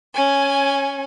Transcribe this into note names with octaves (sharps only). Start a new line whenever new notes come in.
C#4 G#5